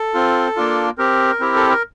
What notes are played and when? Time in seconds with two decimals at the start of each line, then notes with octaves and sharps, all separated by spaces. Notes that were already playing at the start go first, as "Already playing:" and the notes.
Already playing: A4
0.14 C4 F4
0.56 A#3 D4 F4
0.98 C4 G4 A#4
1.40 C4 E4 G4
1.56 A4
1.69 A#4